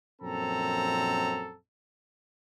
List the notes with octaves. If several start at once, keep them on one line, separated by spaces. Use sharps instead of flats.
A#1 F#2 C4 A4 A#5